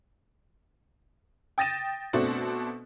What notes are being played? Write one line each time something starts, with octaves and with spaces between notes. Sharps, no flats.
G5 D#6 A6 A#6 D#7 E7
B2 A3 C4 D4 F#4 A4